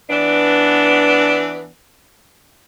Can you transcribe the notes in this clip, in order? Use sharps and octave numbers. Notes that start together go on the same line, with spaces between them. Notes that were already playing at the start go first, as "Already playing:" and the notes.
E3 B3 D4